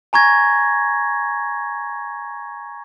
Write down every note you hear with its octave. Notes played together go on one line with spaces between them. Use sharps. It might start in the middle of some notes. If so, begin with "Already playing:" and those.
G#5 A#5 C#6 G#6 A#6